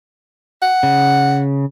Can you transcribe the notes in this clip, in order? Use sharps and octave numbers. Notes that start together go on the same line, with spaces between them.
F#5
C#3